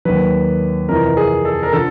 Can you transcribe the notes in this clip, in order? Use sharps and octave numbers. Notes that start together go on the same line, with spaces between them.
D#2 D#3 F#3 B4
F2 C3 E3 A#4
G#4
A4
A#4
D3 F3 A4